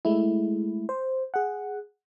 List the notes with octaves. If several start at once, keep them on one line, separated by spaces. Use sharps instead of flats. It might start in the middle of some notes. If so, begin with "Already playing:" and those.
G#3 A3 E4
C5
G#4 F#5